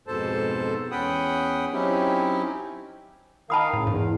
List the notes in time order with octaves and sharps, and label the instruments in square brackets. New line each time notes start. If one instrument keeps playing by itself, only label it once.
[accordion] F2 G#2 B2 A4 C5 A5
E2 C#4 F#5 G5 B5 D#6
F#3 C4 C#4 D#4 E4 G4
[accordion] D#3 A#4 F5 [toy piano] A5 B5 D#6
[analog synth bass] A2 [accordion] C#3
[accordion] E2 [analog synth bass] G#2